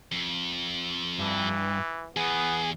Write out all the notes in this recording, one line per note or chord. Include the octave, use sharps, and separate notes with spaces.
F2
G2 E3
E2 B3 G#4